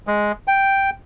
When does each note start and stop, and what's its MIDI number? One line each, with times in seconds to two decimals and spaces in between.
0.07 0.32 56
0.48 0.90 79